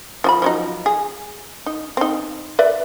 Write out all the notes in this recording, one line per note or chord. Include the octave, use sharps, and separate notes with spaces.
F3 F4 B5
F3 F#3 D#4
G#4
D#4
C4 D#4
B4 D5 E5